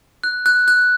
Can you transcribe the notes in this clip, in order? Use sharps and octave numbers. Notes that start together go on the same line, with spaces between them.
F#6
F#6
F#6